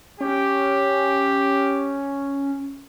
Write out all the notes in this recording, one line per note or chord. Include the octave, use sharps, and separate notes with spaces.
C#4 G4